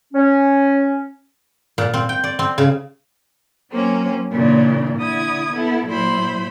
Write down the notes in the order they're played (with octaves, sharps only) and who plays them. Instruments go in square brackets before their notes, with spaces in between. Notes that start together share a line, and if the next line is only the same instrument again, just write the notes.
[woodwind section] C#4
[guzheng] A#2
C4
G5
D5
C4
C#3
[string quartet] F#3 A#3 C4 C#4
A#2 C#3 E3 D4
D3 E4 D#6 G#6
B3 E4 A4
A#2 F#3 E4 C5 B5